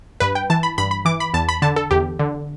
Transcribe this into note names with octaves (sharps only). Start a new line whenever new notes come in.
G2 B4
G5
E3 A5
B5
G2 B5
B5
E3 D6
B5
E2 A5
B5
D3 A5
A4
E2 G4
D3